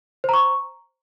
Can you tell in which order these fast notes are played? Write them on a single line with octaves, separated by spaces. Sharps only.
C5 A#5 C#6